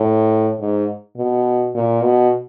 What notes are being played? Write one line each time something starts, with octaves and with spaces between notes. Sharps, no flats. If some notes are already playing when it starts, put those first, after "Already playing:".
Already playing: A2
G#2
B2
A#2
B2